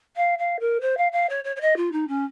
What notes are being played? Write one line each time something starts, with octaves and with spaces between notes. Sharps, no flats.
F5
F5
A#4
C5
F5
F5
C#5
C#5
C#5
D#5
F4
D#4
C#4